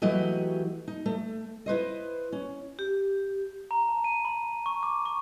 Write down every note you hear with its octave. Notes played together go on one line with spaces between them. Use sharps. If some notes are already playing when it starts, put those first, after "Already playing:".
E3 F#3 A3 E4 G4 D#5
D#4
A3
E4 B4 C5 D#5
C#4
G4
A#5
A5
D#7
B5
C#6
D6
C#6